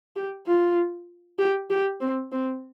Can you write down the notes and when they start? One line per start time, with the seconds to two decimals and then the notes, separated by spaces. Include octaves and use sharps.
0.16 G4
0.47 F4
1.39 G4
1.70 G4
2.00 C4
2.32 C4